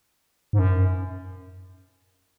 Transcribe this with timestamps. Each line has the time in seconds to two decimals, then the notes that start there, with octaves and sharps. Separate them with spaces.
0.53 G#2
0.59 F#2